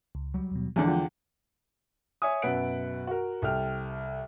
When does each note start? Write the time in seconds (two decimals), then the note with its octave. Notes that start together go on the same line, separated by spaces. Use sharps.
0.15 C#2
0.34 F#3 G3
0.51 D#2 B2
0.76 E2 D3 F3 G#3 C#5 E5 G#5
0.87 F4 F#5 G5
2.22 C#5 E5 G#5 D#6
2.42 F#2 B2 B4 E5 F#5 D7
3.07 F#4 A#4
3.42 C2 A4 G5 F6